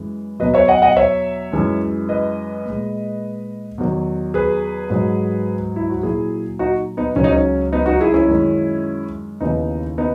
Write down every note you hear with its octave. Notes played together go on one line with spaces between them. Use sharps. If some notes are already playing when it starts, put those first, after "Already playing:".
Already playing: F#2 E3 G#3
E2 B2 F#3 B4 D#5
C#5 E5
D#5 F#5
D#5 F#5
C#5 E5
F#2 E3 G#3
B4 D#5
A#2 G#3
E2 D#3 F#3
G#4 B4
G#2 F#3
E4
F#4
A#2 F#3 E4 G#4
D#4 F#4
B3 D#4
C#2 C#3 F#3 C#4
D#4
C#4
B3 D#4
D#4 F#4
E4 G#4
C#4 E4
F#2 D#3 G#3
D#2 C#3 E3 B3 D#4
B3 D#4